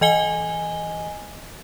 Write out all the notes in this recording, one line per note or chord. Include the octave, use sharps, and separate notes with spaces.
E3 D#5 G#5 G7